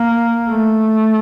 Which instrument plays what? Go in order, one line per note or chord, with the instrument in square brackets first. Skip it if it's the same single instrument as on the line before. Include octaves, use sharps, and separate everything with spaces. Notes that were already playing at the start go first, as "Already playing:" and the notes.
Already playing: [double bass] A#3
A3